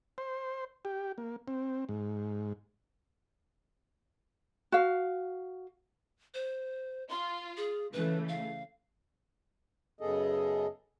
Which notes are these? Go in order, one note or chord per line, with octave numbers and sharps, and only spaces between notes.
C5
G4
A#3
C4
G#2
F#4 F5
C5
F4 C6
G#4
C#3 E3 A3 B4
F5
F#2 C#3 B3 G#4 A4 D#5